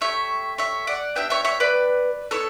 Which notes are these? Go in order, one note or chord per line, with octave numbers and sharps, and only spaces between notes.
A3 E4 G4 C#5 E5
C#5 E5
D5 F#5
B3 D4 G4 E5 G5
C#5 E5
C#5 E5
B4 D5
B3 E4 A4 C#5